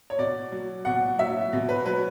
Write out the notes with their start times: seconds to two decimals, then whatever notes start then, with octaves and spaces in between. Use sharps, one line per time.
0.10 C#5
0.18 B2 D5
0.52 F#3
0.85 B2 F#5
1.18 F#3 E5
1.53 B2
1.69 B4
1.86 F#3 B4